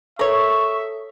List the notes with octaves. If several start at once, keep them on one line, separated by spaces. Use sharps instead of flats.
A4 A#4 C#5 E5 C#6